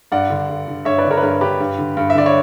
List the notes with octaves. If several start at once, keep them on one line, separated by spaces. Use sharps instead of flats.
G2 D5 F#5
D3
G2
D3
G2 C#5 E5
B4 D5
D3
A#4 C#5
B4
G2 A#4
D3 G4 B4
G2
D3
G2
E5
D3 D5
C#5